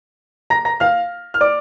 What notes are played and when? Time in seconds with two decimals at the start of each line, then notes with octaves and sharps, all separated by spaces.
0.50 A#5 A#6
0.65 A#5 A#6
0.80 F5 F6
1.34 F6
1.41 D5 D6